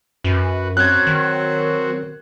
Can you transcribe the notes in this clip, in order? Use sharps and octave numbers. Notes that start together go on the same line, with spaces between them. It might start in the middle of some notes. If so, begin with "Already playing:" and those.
F#2 F#4 B4
F#3 C4 F#4 F#6 G#6
D#3